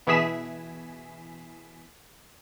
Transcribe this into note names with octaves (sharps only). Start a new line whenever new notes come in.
B2 E3 E4 G#4 B6 E7